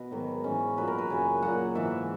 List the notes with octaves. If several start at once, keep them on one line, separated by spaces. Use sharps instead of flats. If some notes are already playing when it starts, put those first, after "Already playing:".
Already playing: B2
G#2 D#3 F#3 B3
G#2 E3 C#4
A#2 F#3 B4
A#4
B4
F#2 C#3 F#3 G#5
A#2 F#3 F#5
G#2 E3 E5